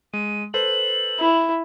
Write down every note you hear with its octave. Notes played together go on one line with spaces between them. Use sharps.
G#3 D#7
A4 B4 C5 F#7
E4